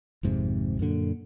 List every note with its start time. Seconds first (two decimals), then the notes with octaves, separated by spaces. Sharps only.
0.23 G#1 F2 G#2 C3
0.79 F#2 A#2 D3